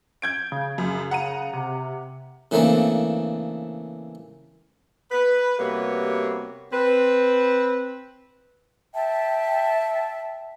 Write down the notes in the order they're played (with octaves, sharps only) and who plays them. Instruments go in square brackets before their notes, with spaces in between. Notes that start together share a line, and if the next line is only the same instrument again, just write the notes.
[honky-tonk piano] G6 G#6 D7
[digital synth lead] C#3
[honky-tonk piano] F#2
F#5 A#5 D#7
[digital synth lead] C3
[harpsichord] C#3 E3 A3 A#3 C4 D4
[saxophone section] B4
C3 G3 A#3 B3 F#4 C#5
C4 B4
[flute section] E5 G5 A5